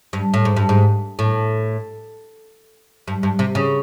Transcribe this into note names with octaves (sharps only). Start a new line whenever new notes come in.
G2
A2
G#2
G2
G#2
A2
G2
G2
C3
C#3